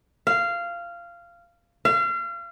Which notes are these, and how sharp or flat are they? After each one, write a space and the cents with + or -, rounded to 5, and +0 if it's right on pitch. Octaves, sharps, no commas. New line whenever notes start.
F5 -15
F5 -35